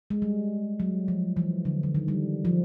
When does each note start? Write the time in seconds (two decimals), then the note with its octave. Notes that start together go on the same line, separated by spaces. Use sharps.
0.10 G#3
0.22 G3
0.80 F#3
1.08 F3
1.37 E3
1.65 D3
1.83 D3
1.95 D#3
2.08 G3
2.45 F3